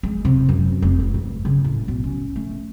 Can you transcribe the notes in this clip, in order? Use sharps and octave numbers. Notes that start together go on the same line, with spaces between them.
G#3
C3
F#2
F1
B3
G2
C#3
A2
B1
C#4
A3